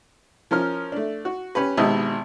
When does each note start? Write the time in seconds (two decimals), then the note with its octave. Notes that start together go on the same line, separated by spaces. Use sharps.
0.51 F3 C#4 A#4 F6
0.92 A3 D4
1.25 F#4
1.55 C#4 G4 B4
1.77 G#1 G#2 B2 G4 D#5 E5